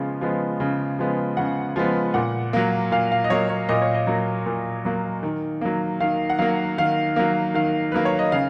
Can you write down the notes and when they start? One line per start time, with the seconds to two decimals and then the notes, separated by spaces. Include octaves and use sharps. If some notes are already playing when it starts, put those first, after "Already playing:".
Already playing: C#3 F3 G#3 B3
0.21 F3 G#3 B3
0.60 C#3
0.99 F3 G#3 B3
1.37 C#3 F#5
1.76 F3 G#3 B3
2.14 A#2 F#5
2.53 F#3 A#3
2.92 A#2 F5
3.12 F5
3.24 D#5
3.30 F#3 A#3 C#5
3.50 C#5
3.69 A#2 D#5
3.82 C#5
3.95 D#5
4.07 F#3 A#3
4.46 A#2
4.85 F#3 A#3
5.23 D#3
5.61 F#3 A#3
6.00 D#3 F5
6.30 F#5
6.39 F#3 A#3 F5
6.78 D#3 F5
7.16 F#3 A#3
7.54 D#3 F5
7.92 F#3 A#3 B4
8.05 C#5
8.19 D#5
8.32 C#3 F5